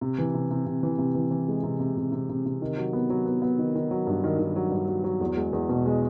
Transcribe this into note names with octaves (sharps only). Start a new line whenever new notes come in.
C3
E3
C3
C3
C3
E3
C3
E3
E3
G#3
C3
C3
C3
C3
C3
C3
D#3
F#3
B3
F#3
B3
B3
D#3
D#3
F#3
G2
D#3
D#3
F#3
G2
F#3
F#3
E2
G#3
E2
B2
G#3